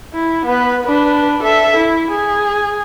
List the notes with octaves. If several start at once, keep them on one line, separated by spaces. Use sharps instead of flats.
E4
B3 B4
D4 B4
A4 E5
E4
G#4